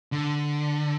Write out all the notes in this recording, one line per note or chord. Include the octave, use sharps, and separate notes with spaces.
D3